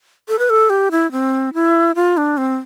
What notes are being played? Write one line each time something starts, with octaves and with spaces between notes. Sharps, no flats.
A4
B4
A4
G4
E4
C4
E4
F4
D4
C4